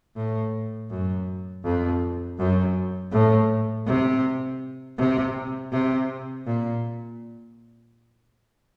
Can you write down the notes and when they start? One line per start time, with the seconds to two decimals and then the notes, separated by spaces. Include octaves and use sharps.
0.16 A2
0.90 F#2
1.64 F2
2.38 F#2
3.12 A2
3.86 C3
4.98 C3
5.72 C3
6.46 A#2